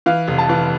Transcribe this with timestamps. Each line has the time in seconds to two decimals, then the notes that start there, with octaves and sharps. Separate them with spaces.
0.06 E3 F5
0.28 F1
0.38 A5
0.49 E3